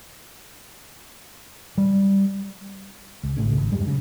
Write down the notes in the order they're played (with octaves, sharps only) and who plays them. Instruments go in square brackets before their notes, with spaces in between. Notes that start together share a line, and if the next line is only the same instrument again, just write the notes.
[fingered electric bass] G3
C#2
G#1 A2 C#3
G#1
D1 F#2 G3 G#3
C#3